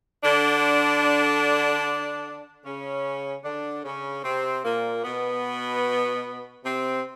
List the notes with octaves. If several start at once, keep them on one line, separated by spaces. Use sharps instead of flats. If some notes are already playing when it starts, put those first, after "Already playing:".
D3 D4
C#3 C#4
D3 D4
C#3 C#4
C3 C4
A#2 A#3
B2 B3
C3 C4